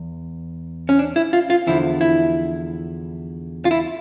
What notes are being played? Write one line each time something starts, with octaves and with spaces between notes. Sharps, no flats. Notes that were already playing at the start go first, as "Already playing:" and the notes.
Already playing: E2
C#4
D4
E4
F4
F4
E2 D3 F3 E4
E4
F4
E4